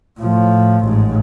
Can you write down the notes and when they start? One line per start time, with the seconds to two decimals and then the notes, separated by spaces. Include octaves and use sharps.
0.20 A2 F3
0.86 A1 G#2